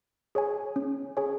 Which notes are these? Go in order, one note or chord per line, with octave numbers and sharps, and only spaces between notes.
G#4 C#5 G#5
C#4
G#4 C#5 G#5